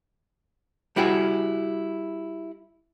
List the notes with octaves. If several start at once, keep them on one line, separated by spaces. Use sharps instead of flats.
G3 E4 F#4 G#4